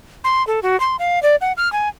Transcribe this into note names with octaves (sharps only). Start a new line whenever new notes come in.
C6
A4
F#4
C6
F5
D5
F#5
F6
G#5